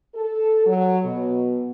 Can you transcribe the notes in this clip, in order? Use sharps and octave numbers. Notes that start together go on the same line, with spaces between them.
A4
F#3
B2